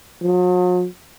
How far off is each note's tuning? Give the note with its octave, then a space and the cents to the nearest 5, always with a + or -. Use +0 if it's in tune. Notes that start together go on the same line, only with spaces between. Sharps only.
F#3 -45